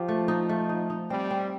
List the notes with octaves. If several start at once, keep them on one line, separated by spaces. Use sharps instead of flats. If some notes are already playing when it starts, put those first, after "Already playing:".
Already playing: F3 G4
A3
D#4
A3
D#4
D#4
G3 C4
C4